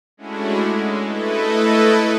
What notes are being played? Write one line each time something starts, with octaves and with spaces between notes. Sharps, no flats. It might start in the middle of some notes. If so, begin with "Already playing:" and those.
G#3 A3 C#4 D4 E4 F#4
G#3
A3 E4 A4 B4 D#5